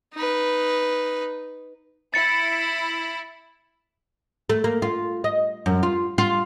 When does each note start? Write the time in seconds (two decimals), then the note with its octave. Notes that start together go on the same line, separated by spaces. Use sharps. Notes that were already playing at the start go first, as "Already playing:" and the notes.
0.14 D#4 B4
2.14 E4 A6 C#7
4.49 A3
4.64 A#3
4.82 F4
5.24 D#5
5.66 F#2
5.83 F4
6.18 F4